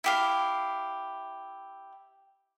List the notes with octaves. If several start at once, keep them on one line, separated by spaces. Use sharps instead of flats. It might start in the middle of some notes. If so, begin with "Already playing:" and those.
E4 G4 F5